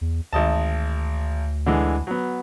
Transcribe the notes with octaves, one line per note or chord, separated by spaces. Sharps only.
E2
G#1 D2 D#5 A5
D3 E3 G#3
F#3 B3